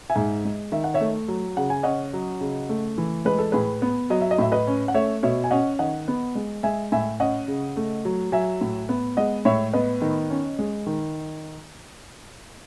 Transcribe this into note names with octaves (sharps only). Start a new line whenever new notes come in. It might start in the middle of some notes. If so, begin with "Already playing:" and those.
E5 G#5
G#2
G#3
D#3 E5
F#5
C#5 E5
A3
F#3
C#3 F#5
G#5
C#4 D#5 F#5
F#3
C#3
A3
E3
G#3 B4
A4
A2 G#4 B4
B3
F#3 D#5
E5
D#5
A2 E5
B4 D#5
C#4
F#5
A3 C#5 E5
B2 C#5 E5
G#5
C#4 D#5 F#5
D#3 D#5 F#5
B3
G#3
G#3 E5 G#5
A2 E5 G#5
C#4 D#5 F#5
C#3
A3
F#3
F#3 E5 G#5
A2
B3
G#3 D#5 F#5
A2 C#5 E5
B3 B4 D#5
D#3
C#4
G#3
D#3